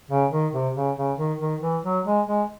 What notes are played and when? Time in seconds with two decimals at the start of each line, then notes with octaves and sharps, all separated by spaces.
0.10 C#3
0.32 D#3
0.53 C3
0.75 C#3
0.97 C#3
1.18 D#3
1.40 D#3
1.61 E3
1.84 F#3
2.05 G#3
2.27 G#3